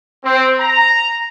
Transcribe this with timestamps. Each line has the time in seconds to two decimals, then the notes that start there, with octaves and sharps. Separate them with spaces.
0.24 C4
0.59 A#5